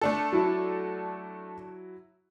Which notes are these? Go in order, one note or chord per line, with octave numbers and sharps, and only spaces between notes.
A3 D4 A4
F#3 E4 F#4